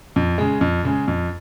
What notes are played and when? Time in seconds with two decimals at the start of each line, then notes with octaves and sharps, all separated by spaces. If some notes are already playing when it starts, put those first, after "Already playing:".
0.16 F2
0.38 C#3 G#3
0.61 F2
0.84 C#3 G#3
1.08 F2